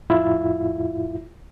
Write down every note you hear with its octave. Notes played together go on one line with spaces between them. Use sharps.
F2 A2 E4 F4